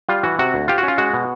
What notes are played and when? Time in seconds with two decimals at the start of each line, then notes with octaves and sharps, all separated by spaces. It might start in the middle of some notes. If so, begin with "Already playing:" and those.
0.09 G3 F4
0.23 E3 F#4
0.39 C3 F#4
0.54 D2
0.68 F4 G4
0.78 F#4
0.83 C#4 F4
0.98 G#3 F#4
1.13 B2